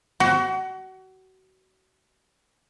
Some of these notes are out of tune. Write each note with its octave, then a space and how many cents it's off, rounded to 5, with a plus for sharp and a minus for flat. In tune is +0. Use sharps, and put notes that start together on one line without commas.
F#4 +30